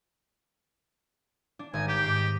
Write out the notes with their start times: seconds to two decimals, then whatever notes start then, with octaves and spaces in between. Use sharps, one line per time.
1.59 D4
1.73 G#1 D#5 G#5
1.88 G4 D6 G6 B6
2.03 G#2 D6 C7
2.16 D#5